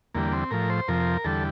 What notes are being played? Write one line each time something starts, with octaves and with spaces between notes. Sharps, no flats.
E2 D3 G3 A#3
C4
A2 F3 A#4
C5
F2 C3 F3 A#4
E2 D3 G3 A4